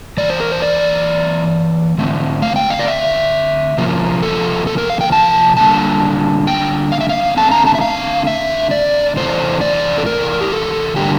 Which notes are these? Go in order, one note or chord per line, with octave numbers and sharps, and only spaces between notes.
E3 A#3 D5
C5
A#4
C5
D5
D3 A3 C4
F5
G5
F5
D5
E5
C3 F3 A#3
A4
A4
A#4
F5
G5
A5
D3 G3 A#3 A5
G5
F5
E5
F5
D3 A3 C4 A5
A#5
A5
E5
F5
E5
D5
C3 E3 A3 C5
D5
A4
A#4
G4
A4
D3 G3 A#3 G4